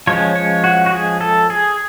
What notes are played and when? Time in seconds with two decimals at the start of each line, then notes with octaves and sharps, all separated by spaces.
0.07 F3 G#3 C#4 C#5
0.36 C#5
0.64 F#4
0.86 F#4
0.92 G#4
1.21 A4
1.50 G#4